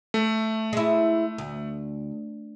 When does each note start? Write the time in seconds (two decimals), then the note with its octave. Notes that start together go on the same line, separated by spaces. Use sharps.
0.14 A3
0.73 G#3 E4
1.38 D2